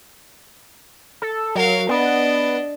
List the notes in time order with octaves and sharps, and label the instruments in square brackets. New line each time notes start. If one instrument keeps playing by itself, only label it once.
[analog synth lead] A4
[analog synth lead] F#3 [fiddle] A#4 F5
[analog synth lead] B3 [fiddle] D4 D#5